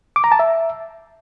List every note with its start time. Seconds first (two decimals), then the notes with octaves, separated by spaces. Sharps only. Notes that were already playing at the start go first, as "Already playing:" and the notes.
0.16 D6
0.24 A#5
0.32 A5
0.39 E5